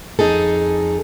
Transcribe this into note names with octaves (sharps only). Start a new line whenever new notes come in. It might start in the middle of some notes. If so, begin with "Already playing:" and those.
F2 G#2 D#4 G#4 A4